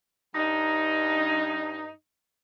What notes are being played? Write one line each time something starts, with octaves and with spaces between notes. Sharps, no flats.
G2 D#4